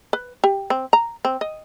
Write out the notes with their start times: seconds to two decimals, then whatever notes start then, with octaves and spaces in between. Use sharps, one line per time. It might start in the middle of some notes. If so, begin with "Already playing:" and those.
0.13 B4
0.44 G4
0.70 C4
0.93 A#5
1.25 C4
1.41 D#5